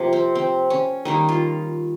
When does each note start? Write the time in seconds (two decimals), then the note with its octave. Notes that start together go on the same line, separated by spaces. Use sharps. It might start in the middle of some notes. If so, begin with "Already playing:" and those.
Already playing: C3 F3 A#3
0.13 C4
0.35 C4
0.70 C#4
1.05 D#3 G3 A#3 D#4
1.29 F4